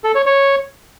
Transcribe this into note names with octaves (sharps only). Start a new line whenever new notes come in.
A4
C#5
C#5